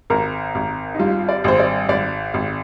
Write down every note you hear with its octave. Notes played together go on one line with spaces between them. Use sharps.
G#1 A#4
G#1
D#4
G2 F4
D5
G#1 C5
D5
G#1 D5
G#1